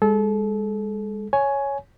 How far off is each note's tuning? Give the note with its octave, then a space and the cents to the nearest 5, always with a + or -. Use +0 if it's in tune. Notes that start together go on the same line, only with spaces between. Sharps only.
G#3 -35 A4 -30
C#5 +0 G#5 +10